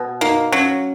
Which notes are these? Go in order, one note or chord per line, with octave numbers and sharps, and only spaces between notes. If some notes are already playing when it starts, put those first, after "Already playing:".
Already playing: B2
A#3 D#4
F#3 C#4